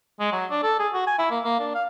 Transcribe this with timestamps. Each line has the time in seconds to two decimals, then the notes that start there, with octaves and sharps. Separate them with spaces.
0.20 G#3
0.32 F#3
0.51 D4
0.63 A4
0.79 G#4
0.94 F#4
1.07 G#5
1.19 E4
1.31 A#3
1.44 A#3
1.59 D4
1.75 F5